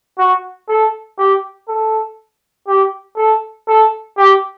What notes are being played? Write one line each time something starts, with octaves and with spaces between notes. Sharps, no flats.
F#4
A4
G4
A4
G4
A4
A4
G4